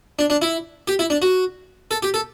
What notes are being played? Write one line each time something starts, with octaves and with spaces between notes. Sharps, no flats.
D4
D4
E4
G4
E4
D4
F#4
A4
G4
A4